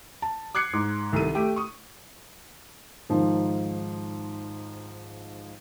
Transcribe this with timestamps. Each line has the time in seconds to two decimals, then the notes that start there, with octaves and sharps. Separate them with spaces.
0.22 A5
0.55 D6 F#6 G#6 C7 C#7
0.73 G#2 D6
1.13 C2 D#3 A4 D#7
1.35 A3 G4 G5
1.56 C#6 D#6
3.09 G#2 D#3 F3